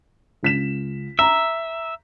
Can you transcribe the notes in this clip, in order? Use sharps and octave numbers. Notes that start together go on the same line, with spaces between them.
C#2 B6 E7
E5 A#5